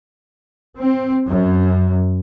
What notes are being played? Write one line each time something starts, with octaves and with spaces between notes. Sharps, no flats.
C4
F#2